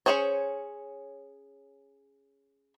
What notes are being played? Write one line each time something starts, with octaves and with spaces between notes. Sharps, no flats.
C#4 F#4 G#4 C5 C#5